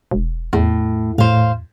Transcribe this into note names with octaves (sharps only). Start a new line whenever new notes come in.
E1
E2 A2
A2 C5 F5